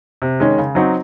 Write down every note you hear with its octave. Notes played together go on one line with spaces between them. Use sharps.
C3
D#3 G#3 C#4
C#3
F#3 C4 D#4 F#4